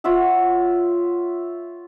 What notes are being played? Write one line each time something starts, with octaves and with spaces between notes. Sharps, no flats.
F4 C#5 E5 F#5